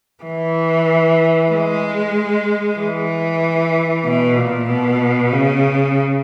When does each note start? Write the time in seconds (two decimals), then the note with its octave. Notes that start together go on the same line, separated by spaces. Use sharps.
0.23 E3
1.50 G#3
2.78 E3
4.05 B2
4.37 A#2
4.69 B2
5.33 C#3